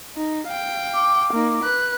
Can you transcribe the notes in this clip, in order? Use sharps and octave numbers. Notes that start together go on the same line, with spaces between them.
D#4
F5 G5
D6
A#3 D#4
B4 F#6